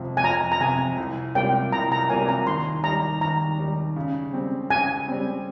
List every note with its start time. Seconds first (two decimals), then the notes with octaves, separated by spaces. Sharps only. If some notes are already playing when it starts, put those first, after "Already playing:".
Already playing: F2 C3 F3
0.17 G#5
0.24 F2 A#5
0.52 A#5
0.60 C3 F3 G#5
0.98 C2
1.35 C3 G3 A#3 F4 G5
1.72 C2 A#5
1.92 A#5
2.09 C3 G3 A#3 F4 G#5
2.29 A#5
2.47 D#2 C6
2.84 D#3 G3 A#5
3.21 D#2 A#5
3.59 D#3 G3
3.96 C#3
4.33 G3 C4
4.70 C#3 G#5
5.08 G3 C4